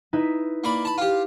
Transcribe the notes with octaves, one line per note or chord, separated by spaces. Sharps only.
D#4 E4 B4
A#3 D5 B5
A5 B5
F4 G4